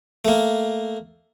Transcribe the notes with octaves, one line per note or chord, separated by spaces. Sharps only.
A3 A#3